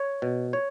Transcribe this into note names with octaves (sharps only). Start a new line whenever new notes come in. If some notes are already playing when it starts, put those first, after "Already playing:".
Already playing: C#5
B2
C#5